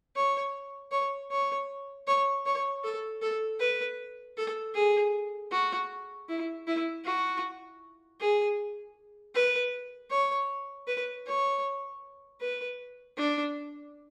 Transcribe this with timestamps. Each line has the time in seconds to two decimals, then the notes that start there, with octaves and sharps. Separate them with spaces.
0.16 C#5
0.92 C#5
1.31 C#5
2.07 C#5
2.46 C#5
2.84 A4
3.22 A4
3.60 B4
4.37 A4
4.75 G#4
5.52 F#4
6.29 E4
6.67 E4
7.05 F#4
8.20 G#4
9.35 B4
10.11 C#5
10.88 B4
11.27 C#5
12.41 B4
13.17 D4